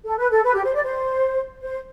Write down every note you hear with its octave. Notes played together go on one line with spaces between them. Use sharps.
A4
B4
A4
B4
G4
C5
D5
C5
C5